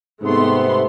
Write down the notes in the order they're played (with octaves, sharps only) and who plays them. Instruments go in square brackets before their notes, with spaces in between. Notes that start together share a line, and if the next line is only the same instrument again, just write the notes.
[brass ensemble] G#2 C3 [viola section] A3 B3 C6